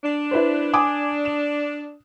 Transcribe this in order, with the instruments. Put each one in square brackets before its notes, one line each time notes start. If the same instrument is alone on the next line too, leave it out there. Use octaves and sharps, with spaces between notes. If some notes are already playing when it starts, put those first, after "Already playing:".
[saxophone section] D4
[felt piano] E4 B4 C5
G#5 D6 D#6
E7